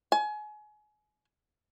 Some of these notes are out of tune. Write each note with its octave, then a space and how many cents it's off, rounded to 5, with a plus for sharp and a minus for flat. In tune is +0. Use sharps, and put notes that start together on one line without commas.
G#5 +30